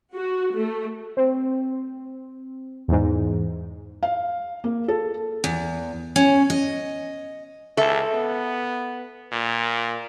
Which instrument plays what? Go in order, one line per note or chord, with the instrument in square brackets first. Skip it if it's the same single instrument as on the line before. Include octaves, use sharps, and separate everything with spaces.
[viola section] F#4
A3
[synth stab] C4
E2 G#2
[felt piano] F5
A#3
A4
[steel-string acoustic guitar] E2
C#4
D#5
[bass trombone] C#2 [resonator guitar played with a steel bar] A4 E5
[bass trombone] B3
A#2